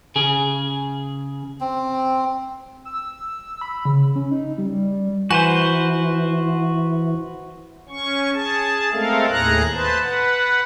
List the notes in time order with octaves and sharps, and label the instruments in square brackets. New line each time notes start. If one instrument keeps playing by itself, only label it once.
[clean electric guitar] C#3 G#4
[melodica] C4
[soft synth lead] E6
B5
C#3
C#4
D#4
G3
[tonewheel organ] E3 [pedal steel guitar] F#4 B4 C5 [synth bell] G#5
[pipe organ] C#4 C#6
G#4 A5
G#3 A3 C4 A4 A#4 F5
D#2 A2 G#4 A#5 F#6
B4 C5 A5
B4 F#5